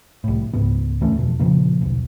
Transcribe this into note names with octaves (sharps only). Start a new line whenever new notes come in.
C2 A2
C#2 G#2 B3
D#2 E3 A3 C#4
F2 B2
A#2 C#3 F3 A#3
D#1 B1